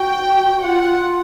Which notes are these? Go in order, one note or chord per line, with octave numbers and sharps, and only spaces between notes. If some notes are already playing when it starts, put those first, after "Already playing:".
Already playing: F#4 G5
F4 F#5
F4